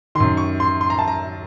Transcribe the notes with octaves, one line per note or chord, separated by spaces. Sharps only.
F#2 D#3 C6
C#6
C6
C6
A#5
A5
A#5